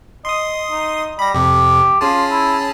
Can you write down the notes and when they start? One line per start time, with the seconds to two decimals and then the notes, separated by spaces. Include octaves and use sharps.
0.25 D#5 C6 D#6
0.71 D#4
1.19 G3 B5 A#6
1.34 F2 C3 G4
2.01 C#4 F4 G#4 A5
2.30 E4